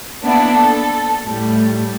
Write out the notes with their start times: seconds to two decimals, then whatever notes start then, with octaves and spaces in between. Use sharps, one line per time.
0.23 A#3 B3 D4 E4
0.57 A4
1.26 A2 G3 A3